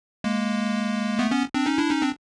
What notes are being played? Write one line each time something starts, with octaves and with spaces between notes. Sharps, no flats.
G#3 A#3
A3 B3
B3 C#4
C4 D4
C#4 D#4
D4 E4
C#4 D#4
C4 D4